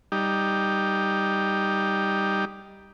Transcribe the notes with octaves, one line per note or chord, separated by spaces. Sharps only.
G3 D#4 G4